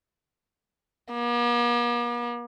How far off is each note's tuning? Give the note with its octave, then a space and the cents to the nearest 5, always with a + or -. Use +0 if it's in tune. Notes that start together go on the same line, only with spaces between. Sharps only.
A#3 +45